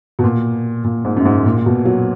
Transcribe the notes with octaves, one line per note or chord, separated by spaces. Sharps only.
B2
A#2
A#2
G#2
F#2
G#2
A#2
B2
F#3